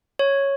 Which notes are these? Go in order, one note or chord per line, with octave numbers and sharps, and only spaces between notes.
C#5